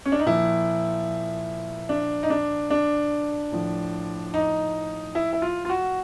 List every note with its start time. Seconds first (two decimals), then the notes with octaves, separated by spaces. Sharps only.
0.06 C#4
0.12 D4
0.19 D#4
0.26 A#2 F3 E4
1.89 D4
2.23 D#4
2.30 D4
2.70 D4
3.52 A2 F3
4.34 D#4
5.15 E4
5.33 E4
5.42 F4
5.65 F4
5.69 F#4